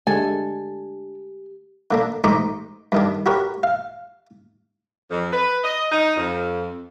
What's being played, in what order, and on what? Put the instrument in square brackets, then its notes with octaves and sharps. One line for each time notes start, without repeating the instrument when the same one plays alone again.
[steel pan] D3 G#3 A3 [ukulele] D4 A4 [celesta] G4 [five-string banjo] G#5
[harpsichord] D3 A#3 D4
A1 G#2 D#4 C5 C#6 D6
G2 D#3 D4
F#4 G4 A#4 B4 C#5
F5
[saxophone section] F2
B4
D#5
D#4
F2